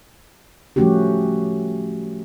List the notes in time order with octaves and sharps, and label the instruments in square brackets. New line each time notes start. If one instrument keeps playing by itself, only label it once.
[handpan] F3 G3 A3 C#4 F#4 G4